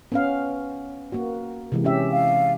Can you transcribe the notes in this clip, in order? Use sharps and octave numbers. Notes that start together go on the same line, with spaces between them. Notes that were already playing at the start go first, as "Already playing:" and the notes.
B3 C#4 F5
A#3 F#4
C3 E3 G#3
C#4 G4 E5
F5